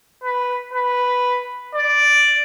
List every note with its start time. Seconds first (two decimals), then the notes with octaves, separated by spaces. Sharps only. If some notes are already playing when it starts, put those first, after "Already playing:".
0.24 B4
0.73 B4
1.75 D5